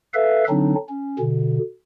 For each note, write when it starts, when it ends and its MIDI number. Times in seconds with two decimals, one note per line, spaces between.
0.14 0.44 69
0.14 0.44 71
0.14 0.44 76
0.14 0.44 77
0.49 0.74 50
0.49 0.74 54
0.49 0.74 60
0.49 0.74 62
0.49 0.74 63
0.89 1.18 61
1.19 1.59 47
1.19 1.59 50